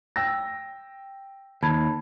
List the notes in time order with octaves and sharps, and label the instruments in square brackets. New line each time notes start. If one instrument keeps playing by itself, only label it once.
[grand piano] G5 E6 A#6
[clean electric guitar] D#2 [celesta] A5 B5 G#6